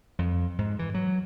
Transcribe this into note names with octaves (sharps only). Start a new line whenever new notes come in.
F2
G#2
E3
F#3